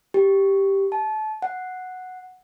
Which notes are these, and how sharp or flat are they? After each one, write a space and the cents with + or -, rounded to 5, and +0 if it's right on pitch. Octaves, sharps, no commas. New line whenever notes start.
G4 -5
A5 -30
F#5 -5